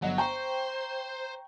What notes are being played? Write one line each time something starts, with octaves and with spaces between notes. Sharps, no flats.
G1 F#3 D#5 F#5
C5 G5 A#5 C#6